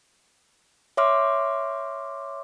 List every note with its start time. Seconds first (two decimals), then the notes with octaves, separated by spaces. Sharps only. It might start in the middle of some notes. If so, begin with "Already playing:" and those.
0.97 C#5 E5 C6 D6 F6